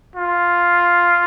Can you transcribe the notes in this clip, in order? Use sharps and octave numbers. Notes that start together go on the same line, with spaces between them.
F4